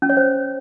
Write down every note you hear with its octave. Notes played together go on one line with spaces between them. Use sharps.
C#4
C#5
C5